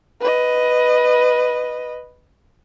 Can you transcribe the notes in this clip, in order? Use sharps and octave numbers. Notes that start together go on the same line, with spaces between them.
B4 D#5